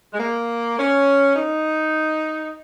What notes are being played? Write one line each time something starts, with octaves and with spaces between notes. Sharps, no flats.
G#3
A#3
C#4
D#4